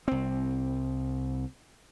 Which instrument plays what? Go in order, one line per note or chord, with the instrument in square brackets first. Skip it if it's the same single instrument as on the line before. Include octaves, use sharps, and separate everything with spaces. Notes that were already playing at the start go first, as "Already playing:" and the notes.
[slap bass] C2 C4